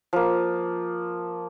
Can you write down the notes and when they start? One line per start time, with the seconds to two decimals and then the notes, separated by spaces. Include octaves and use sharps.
0.13 F3 A#3